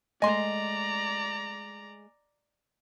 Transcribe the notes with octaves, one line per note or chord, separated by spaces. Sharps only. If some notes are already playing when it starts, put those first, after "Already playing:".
G#3 A3 D5 D#5 G#5 A#5 C6